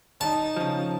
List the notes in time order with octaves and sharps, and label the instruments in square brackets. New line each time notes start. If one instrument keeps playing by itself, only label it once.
[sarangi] D#4 [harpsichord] A5
[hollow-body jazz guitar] C#3 F3